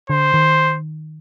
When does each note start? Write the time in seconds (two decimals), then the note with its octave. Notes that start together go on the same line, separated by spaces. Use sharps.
0.09 D3 C5
0.34 D#3